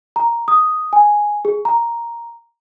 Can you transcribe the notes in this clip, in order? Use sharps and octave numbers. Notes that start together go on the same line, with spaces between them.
A#5
D#6
G#5
G#4
A#5